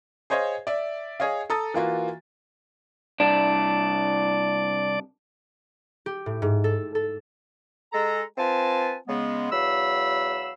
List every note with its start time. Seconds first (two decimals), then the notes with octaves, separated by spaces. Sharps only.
0.30 G#4 C5 C#5 D#5 F5
0.67 D5 E5
1.20 G#4 C#5 D#5 F5
1.50 A4 A#5 D#6 A6
1.74 E3 A#3 F4 F#4
3.20 C2 D4 D5
6.06 G4
6.26 A2
6.42 G#2
6.64 A4
6.95 A4
7.93 G#3 A4 A#5
8.38 C4 F4 B4 G#5 A5
9.08 C#3 G#3 B3
9.52 E2 F#3 F5 B5 E6